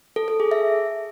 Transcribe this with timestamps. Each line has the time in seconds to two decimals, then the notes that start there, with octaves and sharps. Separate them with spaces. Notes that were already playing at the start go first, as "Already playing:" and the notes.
0.16 A4
0.28 A4
0.40 G#4
0.51 E5